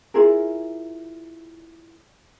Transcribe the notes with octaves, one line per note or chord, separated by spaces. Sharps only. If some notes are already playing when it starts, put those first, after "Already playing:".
E4 F4 G#4 A#4